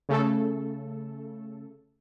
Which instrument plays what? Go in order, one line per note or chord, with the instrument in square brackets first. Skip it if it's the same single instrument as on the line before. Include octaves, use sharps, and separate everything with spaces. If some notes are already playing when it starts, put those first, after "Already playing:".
[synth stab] C#3 A3 A4